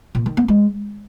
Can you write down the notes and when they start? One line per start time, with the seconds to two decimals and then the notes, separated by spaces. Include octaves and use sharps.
0.15 A#2
0.26 D#3
0.37 B3
0.48 G#3